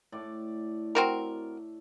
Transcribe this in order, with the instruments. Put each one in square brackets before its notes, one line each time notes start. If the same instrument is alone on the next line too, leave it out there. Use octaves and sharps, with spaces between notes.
[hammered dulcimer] A2 D5
[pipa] C4 F#4 A#4